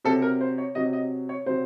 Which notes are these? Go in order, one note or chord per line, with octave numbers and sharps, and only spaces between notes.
C3 F#3 A4
A#4
C5
C#5
C3 F#3 D#5
D#5
C#5
C3 F#3 C5